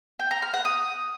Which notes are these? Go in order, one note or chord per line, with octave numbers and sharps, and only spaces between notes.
G5
A#5
F6
F#5
D#6